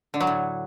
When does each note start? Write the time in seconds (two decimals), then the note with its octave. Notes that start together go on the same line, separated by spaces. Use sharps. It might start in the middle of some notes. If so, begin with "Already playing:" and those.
0.14 D3
0.20 F#3
0.27 A2